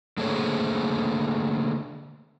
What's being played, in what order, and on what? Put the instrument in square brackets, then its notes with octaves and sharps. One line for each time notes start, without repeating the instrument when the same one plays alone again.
[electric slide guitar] D3 A3 A#3 G#4 C5 C#5